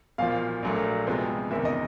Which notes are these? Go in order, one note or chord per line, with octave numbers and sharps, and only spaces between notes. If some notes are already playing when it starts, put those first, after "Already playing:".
B1 A#2 F3 F5
A#1 A#2 F#3 A3
F2 C3 F3 G#3 B3
F#1 E2 C3 D#3 E5
D#5